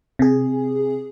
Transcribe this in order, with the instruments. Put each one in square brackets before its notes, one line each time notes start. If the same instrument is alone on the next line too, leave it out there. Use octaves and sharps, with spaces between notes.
[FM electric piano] C3 G#4